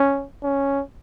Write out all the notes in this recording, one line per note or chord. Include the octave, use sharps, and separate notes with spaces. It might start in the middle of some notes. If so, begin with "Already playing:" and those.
Already playing: C#4
C#4